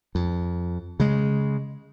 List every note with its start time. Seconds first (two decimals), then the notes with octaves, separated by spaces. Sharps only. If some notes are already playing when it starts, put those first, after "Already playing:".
0.15 F2
1.00 C#3 G#3